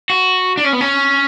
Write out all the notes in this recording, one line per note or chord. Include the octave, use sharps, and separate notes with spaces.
F#4
D4
C#4
B3
C#4